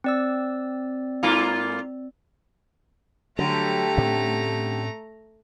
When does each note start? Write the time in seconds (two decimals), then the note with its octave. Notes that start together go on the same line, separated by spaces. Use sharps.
0.04 C4 D5 E6
1.23 G#2 A#3 F4
3.39 D3 F#3 G3 A3 A#5
3.97 A2 C4 C#4